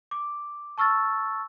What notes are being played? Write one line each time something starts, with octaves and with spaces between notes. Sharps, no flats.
D6
A5 C#6 E6 F6 A6